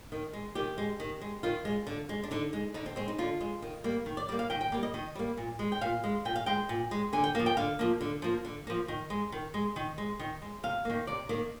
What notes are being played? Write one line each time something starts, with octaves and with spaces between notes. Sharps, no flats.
D#3
G#3
D#3 G4
G#3
D#3
G#3
D#3 F4
G#3
D3
G#3
D4
D3 D#4
G#3
D3 D#4
C4
G#3 C4
D#4
D3 F4
G#3
D#3
G3 A#3
D#3
D5
G3 A#3 D5
F5
D#3 G5
G5
G3 A#3 D5
D#5
D#3 D#5
G3 A#3
A#2
G#3
G5
A#2 F5
G#3
A#2 G5
F5
G#3 G5
A#2
G#3
D3 G#5
G5
F3 A#3 F5
G5
D3 F5
F3 A#3
D3
F3 A#3
D3
F3 A#3
D#3
G#3
D#3
G#3
D#3
G#3
D#3
G#3
C3 F5
D#3 A#3
C3 D5
D#3 A#3